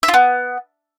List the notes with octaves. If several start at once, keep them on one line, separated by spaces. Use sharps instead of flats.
E5
F4
B3